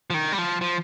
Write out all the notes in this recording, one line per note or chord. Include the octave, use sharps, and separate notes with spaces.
F3
D#3
G3
F3
F3